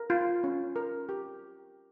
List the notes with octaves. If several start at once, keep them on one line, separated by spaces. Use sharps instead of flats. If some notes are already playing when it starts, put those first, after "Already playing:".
Already playing: A#4
F4
C#4
A#4
G4